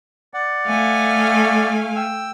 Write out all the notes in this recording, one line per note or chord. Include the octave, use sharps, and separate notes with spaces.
D5 F#5
A3 F5 G#5
G5 E6